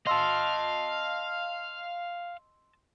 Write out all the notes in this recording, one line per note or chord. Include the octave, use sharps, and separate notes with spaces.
D#5 F5 A5 C6 E6